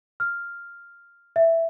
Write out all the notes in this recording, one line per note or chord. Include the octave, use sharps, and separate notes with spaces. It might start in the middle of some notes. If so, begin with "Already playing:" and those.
F6
E5